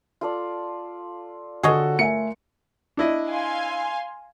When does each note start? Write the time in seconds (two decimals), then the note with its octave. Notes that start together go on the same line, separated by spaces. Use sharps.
0.21 F4 A4 D5
1.63 D3 F#4 G#4 A4 C#5 D#5
1.99 A3 A#4 E5 G#5 C#7
2.97 D4 E4 D#5
3.28 F5 G#5 C6